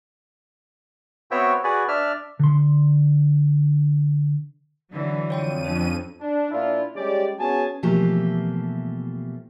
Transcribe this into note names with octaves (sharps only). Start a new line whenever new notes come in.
B3 C4 F#4 C#5 E5 G5
F#4 G#4 B4 D5
D4 D5 E5 F6
D3 C6
D3 E3 F#3
F2 C#5 G5 C6 D#7
C#4 D4 C5
D4
A#2 A#3 D4 E4 F4
G3 G#3 C#4 G4 D5
B3 C#4 F#4 G#4 G#5 A5
B2 E3 F3 A3 A#3 G4